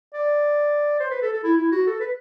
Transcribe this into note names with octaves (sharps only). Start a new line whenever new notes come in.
D5
C5
B4
A4
A4
E4
E4
F#4
A4
B4